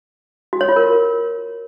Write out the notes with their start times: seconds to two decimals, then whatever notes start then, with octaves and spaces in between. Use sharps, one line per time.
0.53 F#4
0.61 C#5
0.69 F4
0.76 A#4